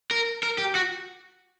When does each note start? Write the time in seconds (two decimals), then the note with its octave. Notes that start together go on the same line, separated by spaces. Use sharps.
0.11 A#4
0.43 A#4
0.58 G4
0.75 F#4